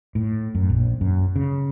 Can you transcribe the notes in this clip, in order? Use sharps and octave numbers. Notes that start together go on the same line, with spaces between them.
A2
F#2
A#1
F#2
C#3